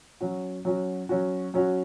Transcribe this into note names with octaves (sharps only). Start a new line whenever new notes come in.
F#3 C#4 F#4
F#3 C#4 F#4
F#3 C#4 F#4
F#3 C#4 F#4